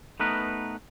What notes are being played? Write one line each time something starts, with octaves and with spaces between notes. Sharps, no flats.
A3 B3 D#4 A#4 B4